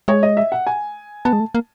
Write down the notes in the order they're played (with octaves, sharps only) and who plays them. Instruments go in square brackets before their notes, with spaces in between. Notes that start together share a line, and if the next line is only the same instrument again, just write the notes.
[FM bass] G#3 [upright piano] C#5
[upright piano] D#5
E5
F#5
G#5
[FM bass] B3 [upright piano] A5
[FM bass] G#3
A3
A#3